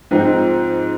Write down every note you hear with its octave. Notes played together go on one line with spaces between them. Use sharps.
G#2 F3 C4 D#4